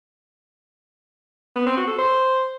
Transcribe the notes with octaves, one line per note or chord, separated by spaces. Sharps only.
B3
C4
F#4
A4
C5